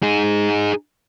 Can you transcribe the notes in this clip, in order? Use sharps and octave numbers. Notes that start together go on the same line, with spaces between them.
D#4 G#4